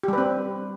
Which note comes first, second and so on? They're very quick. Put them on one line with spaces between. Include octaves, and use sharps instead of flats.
G4 G3 B4 C4